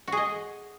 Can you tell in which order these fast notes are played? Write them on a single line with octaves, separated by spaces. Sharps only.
F#4 G#4 D#5